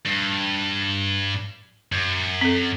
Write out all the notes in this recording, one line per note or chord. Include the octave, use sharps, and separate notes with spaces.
G2
F#2
C4 A4